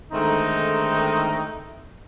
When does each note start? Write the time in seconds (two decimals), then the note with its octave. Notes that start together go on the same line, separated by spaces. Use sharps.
0.13 D3 D#3 G#3 A3 C4 D#4